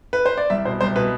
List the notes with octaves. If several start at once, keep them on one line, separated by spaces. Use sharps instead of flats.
B4
C5
D5
C2 E5
B2 C5
C2 C5
B2 B4